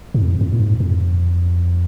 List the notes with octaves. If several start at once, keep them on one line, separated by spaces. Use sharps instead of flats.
G#2
F2
F2
A#2
G#2
F2